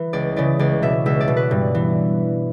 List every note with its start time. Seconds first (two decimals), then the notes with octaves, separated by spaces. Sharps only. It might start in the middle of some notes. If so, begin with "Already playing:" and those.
Already playing: E3 B4
0.13 C#2 D5
0.36 C#3 E3 D5
0.59 C#2 D5
0.82 B2 E5
1.06 C#2 E5
1.20 D5
1.28 B2
1.37 B4
1.51 G2
1.75 E3